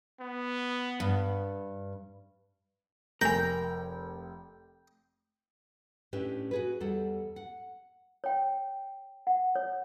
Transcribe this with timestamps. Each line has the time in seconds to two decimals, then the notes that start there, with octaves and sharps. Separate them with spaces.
0.20 B3
1.00 G2
3.21 F1 A#4 G5 G#5 A#6
6.13 A2 C#4 D4 G4 B4 E5
6.51 F#4 G#4 B4
6.80 E2 G3 A4 F#5
7.36 F#5
8.24 C#5 G5
9.27 F#5
9.56 C#5